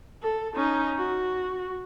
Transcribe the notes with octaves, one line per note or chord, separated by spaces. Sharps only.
A4
C#4 D#4
F#4